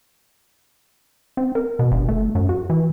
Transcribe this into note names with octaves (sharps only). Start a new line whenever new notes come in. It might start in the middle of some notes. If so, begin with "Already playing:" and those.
C4
A#4
B2
G1
A3
F#2
F#4
E3